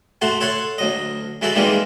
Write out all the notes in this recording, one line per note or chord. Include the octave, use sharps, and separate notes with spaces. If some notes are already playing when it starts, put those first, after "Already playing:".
A3 F#4 C5 F#5
A4 C#5 F#5 C6
D2 F#3 D#5
F#3 G#3 E4 F#4 A4
D#3 E3 G3 G#3 A#3 C4